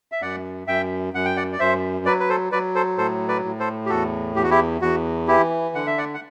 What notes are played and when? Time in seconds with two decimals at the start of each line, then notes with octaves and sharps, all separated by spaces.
0.12 E5
0.21 F#2 D5 F#5
0.67 F#2 E5 G5
1.14 F#2 F#5
1.25 G5
1.37 D5 F#5
1.53 D5
1.59 F#2 C5 E5
2.05 F#3 B4 D5
2.20 B4
2.29 A4 C5
2.52 F#3 B4 D5
2.75 A4 C5
2.98 A2 A4 C5
3.28 B4 D5
3.45 A2
3.59 A4 C5
3.86 G4
3.90 E2 F#4 A4
4.36 E2 G4
4.43 F#4
4.50 E4 G4
4.82 E2 F#4
5.28 E3 E4 G4
5.75 D3 F#5
5.87 E5
5.98 D5 F#5
6.14 F#5